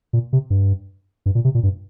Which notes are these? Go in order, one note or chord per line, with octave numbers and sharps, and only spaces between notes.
A#2
C3
G2
G2
A#2
C3
A#2
G2